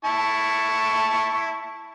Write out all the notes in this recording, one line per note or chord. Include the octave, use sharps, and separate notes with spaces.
E4 A5 C#6